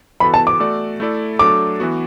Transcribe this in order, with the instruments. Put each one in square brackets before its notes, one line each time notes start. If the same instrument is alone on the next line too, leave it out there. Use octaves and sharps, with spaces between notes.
[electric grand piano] E3 B3 F#4 A4 [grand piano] B5
[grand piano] A5
D6
[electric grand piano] A3 F#4 A4 D5
A3 E4 A4 D5
[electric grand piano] F#3 A3 D4 A4 [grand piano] D6
[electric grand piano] E3 B3 F#4